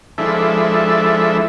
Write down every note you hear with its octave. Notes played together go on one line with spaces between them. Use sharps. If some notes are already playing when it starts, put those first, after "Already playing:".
F3 G#3 D4 E4 A4 E5